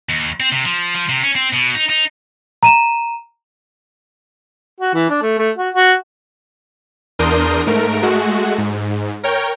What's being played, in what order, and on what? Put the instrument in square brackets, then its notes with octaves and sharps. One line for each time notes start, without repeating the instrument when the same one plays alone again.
[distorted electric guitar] D#2
C4
C3
F3
F3
C3
C#4
C4
B2
D#4
D#4
[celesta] A#5 D#7 E7
[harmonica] F#4
E3
D4
A3
A3
F#4
F#4
[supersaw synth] E2 D4 A#4 C6 D#6 G6
G#2 A3 A#4 D7
G#3 A3 F#4
G#2
A#4 C#5 G5